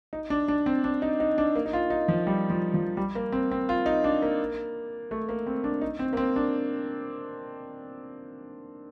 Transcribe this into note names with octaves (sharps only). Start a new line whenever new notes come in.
D#4
D4
D4
C4
D4
D#4
D#4
D4
A#3
D#4
F4
D#4
F3
G3
F3
F3
G3
A#3
C4
C4
F4
D#4
D4
A#3
A3
A#3
C4
D4
D#4
C4
A#3
C4
D4